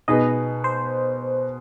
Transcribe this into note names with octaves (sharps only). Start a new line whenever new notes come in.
B2 B3 D#4 G#4 B4 D#5
C5